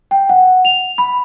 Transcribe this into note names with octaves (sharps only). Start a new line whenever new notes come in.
G5
F#5
F7
B5